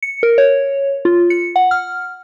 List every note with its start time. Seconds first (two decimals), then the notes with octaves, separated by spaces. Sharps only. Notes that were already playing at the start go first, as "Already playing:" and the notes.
0.03 C#7
0.23 A#4
0.38 C#5
1.05 F4
1.30 C#7
1.56 F#5
1.71 F6